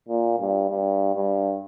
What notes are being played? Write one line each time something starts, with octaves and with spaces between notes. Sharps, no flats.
A#2
G2
G2
G2